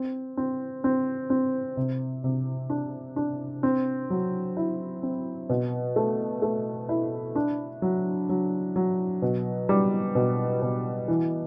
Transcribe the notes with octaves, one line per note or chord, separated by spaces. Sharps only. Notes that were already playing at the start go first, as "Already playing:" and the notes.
Already playing: C4
C4
C4
C4
C3
C3
D4
D4
C4
F#3
E4
C4
B2
A3
A3
E4
D4
F#3
F#3
F#3
B2
G3
B2
B2
E3